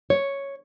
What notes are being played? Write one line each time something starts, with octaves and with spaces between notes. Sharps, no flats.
C#5